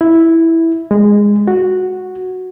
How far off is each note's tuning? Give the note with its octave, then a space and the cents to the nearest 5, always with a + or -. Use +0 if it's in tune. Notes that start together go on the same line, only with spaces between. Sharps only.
E4 -5
G#3 -15
F#4 -5